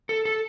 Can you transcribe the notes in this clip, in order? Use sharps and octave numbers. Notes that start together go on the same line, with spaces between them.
A4
A4